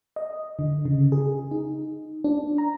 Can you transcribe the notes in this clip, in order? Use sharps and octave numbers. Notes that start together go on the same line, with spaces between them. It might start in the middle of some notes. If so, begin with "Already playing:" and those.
D#5
D3
C#3
G#4
D#4
D4
A#5